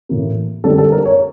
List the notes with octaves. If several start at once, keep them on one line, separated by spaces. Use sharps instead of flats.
A2 E3 A#3
D3 G3 A#3 A4
A4
A#4
C#5